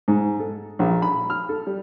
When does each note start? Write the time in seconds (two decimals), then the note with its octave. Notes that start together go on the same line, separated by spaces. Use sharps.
0.08 G#2
0.40 A4
0.79 A#1
1.02 B5
1.30 F6
1.49 A4
1.67 G3